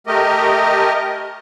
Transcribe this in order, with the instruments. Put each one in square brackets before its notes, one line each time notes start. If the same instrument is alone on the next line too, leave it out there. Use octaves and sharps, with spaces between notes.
[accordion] A3 G4 A#4 D#5